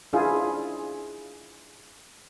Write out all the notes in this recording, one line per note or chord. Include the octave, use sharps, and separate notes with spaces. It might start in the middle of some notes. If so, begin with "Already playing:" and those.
D4 E4 F4 G#4